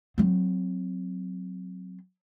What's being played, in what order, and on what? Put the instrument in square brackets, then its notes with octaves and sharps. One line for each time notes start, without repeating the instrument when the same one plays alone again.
[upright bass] F#3 C4